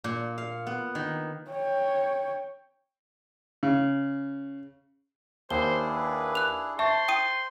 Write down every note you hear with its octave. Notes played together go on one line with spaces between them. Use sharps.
A#2
F5
B3
D#3
C#5 G5
C#3
D#2 D4 E4 G#4 C5 G7
B4
F#6 F7
C5 E5 A5 C6 C#6
G5 D#6 D#7